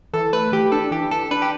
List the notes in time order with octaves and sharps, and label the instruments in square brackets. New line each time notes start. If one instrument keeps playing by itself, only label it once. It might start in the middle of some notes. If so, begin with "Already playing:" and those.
[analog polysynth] E3 [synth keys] A4
[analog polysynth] A3 [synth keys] B4
[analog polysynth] E3 [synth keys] G4
[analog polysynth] D4 [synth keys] A4
[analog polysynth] E3 [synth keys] G4
[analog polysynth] E3 [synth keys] A4
[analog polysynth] D4 [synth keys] B4
[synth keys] G4